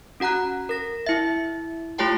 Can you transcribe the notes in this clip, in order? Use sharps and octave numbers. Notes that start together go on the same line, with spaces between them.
C#4 F#4 F#5 A#5 F#6
A#4 A#6
E4 E5
A3 F4 G4 C#5 G5 A5